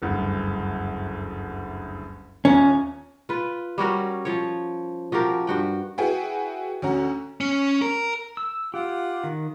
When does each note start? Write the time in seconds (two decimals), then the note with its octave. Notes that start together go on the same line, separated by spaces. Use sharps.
0.02 F#1 D2 G2
2.45 D#1 C#4 A#5
3.29 F4 B4
3.78 G3 C#4 F#4 A#4
4.25 F3 C#5
5.12 F3 F#4 G4 A#4
5.47 G2 F#4 G5
5.98 E4 F#4 G#4 B4 G5
6.82 D2 C#4 F#4 A#5
7.41 C#4
7.82 A#4
8.37 E6
8.74 F4 G4 F#5
9.24 D#3